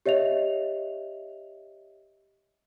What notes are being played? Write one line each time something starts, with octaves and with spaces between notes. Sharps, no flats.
G4 C#5 D#5 E5 F7